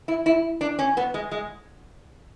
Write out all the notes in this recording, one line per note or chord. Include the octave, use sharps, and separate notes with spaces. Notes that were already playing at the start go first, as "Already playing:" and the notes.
E4
E4
D4
C#4
B3
G#3
G#3